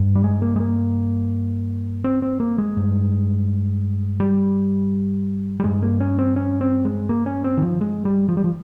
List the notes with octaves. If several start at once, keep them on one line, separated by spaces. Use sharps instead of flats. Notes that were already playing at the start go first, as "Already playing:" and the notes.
Already playing: G2
G3
G#3
A#3
G#3
A#3
C4
C4
A#3
G#3
G2
G3
G3
G2 G#3
A#3
C#4
C4
C#4
C4
G#3
A#3
C#4
C4
D#3
F3
G#3
G3
F3
G3
F3